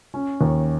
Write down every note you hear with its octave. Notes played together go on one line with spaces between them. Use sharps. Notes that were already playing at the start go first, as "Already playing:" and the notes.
C#4
D#2